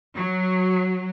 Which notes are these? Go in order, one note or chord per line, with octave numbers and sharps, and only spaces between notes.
F#3